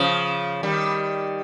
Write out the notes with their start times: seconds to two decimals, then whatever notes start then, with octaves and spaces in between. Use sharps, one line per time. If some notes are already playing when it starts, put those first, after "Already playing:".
Already playing: C#3 F3
0.63 D#3 G3